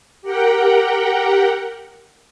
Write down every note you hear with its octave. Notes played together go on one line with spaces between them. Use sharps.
G4 A#4 F#5 G5